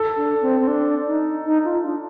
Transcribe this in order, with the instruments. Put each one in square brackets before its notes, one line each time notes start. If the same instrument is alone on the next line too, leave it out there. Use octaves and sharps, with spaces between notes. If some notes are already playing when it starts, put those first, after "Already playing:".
Already playing: [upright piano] A4
[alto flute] D4
C4
C4
D4
D#4
D#4
F4
D4